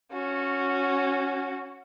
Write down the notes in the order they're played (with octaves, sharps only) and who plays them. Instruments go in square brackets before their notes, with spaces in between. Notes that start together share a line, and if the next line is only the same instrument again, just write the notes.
[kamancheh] C#4 F#4